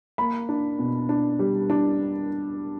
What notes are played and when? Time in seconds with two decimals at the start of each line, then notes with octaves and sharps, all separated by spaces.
0.18 A#3 B5
0.49 D4
0.79 B2
1.09 D4
1.39 G3
1.70 D4